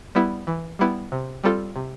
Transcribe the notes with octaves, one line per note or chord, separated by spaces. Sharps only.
G3 B3 E4
E3
G3 B3 E4
C3
G3 C4 F4 A4
C3